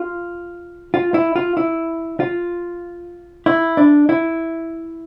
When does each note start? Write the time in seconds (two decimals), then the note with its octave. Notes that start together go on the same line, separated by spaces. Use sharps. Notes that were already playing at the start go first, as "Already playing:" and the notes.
Already playing: F4
0.94 F4
1.14 E4
1.36 F4
1.57 E4
2.20 F4
3.46 E4
3.77 D4
4.09 E4